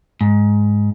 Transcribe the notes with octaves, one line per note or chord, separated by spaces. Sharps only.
G#2